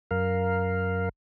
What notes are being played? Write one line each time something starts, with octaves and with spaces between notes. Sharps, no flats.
F#2 A#4 F5